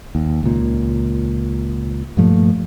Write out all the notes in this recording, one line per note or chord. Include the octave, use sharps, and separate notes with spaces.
D#2
C#2 A#2
G2 A#2 F3 A3